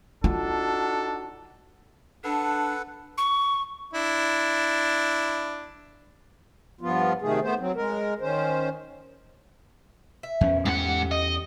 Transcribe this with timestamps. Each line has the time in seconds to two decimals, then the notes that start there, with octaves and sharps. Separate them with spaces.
0.24 D4 D#4 F4 F#4 A4
2.24 D4 A4 B4 F#5
3.18 C#6
3.94 D4 E4
6.81 G2 F3 B3 F4
7.22 C3 D#3 A3 G#4
7.43 A3 B3 C5
7.59 F#3 C4
7.76 G#3 A#4
8.21 D#3 C#4 C5
10.23 E5
10.41 E2 C#4
10.66 G#2 G4 F#5
11.11 D#5